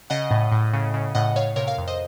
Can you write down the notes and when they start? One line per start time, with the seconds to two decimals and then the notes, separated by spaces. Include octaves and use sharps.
0.10 C#3 D#5 F#5
0.31 A2
0.52 A2
0.73 C#3
0.94 C#3
1.15 A2 D#5 F#5
1.36 A2 C#5 F5
1.56 C3 A#4 C#5
1.67 C#5 F5
1.78 F2
1.88 C5 D#5